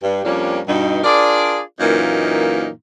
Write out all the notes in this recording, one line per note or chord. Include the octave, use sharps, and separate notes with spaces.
G2
F2 F3 G3 A#3 C#4 D4
G2 B2 D#4
D4 F4 G#4 A#4 D5
F#2 A#2 E3 A#3 D#4